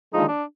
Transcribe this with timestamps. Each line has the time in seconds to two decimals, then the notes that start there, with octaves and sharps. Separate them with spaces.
0.13 D#2 D3 F3 G#3 D#4
0.28 D4